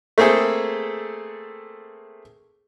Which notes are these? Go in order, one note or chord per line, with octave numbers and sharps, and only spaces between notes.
A3 A#3 C4 G#4 A4